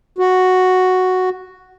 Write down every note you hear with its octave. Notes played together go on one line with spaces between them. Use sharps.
F#4